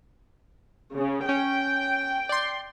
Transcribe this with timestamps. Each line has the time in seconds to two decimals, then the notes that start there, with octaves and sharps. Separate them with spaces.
0.96 C#3
1.29 C#4 G5
2.29 D5 C6